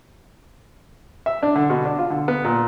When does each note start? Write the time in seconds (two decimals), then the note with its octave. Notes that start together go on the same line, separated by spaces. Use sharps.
1.26 E5
1.43 D4
1.55 D3
1.70 B2
1.85 D4
1.99 F4
2.10 D3
2.28 B3
2.44 A#2